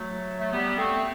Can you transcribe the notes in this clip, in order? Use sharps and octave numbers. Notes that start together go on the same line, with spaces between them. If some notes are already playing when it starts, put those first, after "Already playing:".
Already playing: F#3 A3
A3
G3 B3
A3 C4